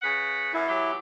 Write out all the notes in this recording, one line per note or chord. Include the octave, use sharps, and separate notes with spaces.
C#3 B4 F#5
F#2 E4
E3 F#3 G4